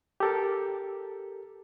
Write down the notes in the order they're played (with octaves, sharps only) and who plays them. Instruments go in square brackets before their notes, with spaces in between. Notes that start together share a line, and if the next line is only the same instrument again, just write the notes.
[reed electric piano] G4 A4 A#4